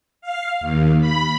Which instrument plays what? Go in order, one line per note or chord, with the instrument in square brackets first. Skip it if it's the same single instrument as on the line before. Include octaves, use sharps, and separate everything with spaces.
[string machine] F5
D#2
B5